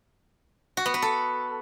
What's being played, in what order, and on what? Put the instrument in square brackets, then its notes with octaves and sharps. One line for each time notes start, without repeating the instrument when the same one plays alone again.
[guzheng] F#4
B3
B4
A4